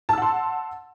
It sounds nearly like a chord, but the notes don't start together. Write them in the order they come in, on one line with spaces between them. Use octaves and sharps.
A5 E6 F#5 C6